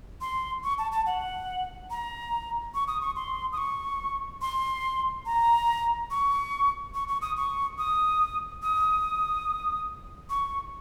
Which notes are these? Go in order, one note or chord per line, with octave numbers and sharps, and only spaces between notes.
C6
C#6
A5
A5
F#5
A#5
C#6
D#6
C#6
C6
D#6
C#6
C6
A#5
C#6
C#6
C#6
D#6
C#6
D#6
D#6
C#6